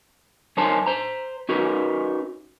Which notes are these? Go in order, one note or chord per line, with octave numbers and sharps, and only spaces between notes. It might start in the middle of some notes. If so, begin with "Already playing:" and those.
F#2 C#4 D#4 A#4 C5 A5
C5 A#5
C#4 D#4 F#4 A#4 B4